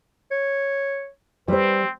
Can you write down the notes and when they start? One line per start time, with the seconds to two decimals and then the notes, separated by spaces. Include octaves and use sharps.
0.31 C#5
1.48 G3 C4 B4 C5